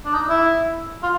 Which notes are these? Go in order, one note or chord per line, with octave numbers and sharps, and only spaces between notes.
D4
D#4
E4
F4